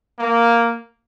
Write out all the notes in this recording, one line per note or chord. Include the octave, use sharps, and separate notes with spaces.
A#3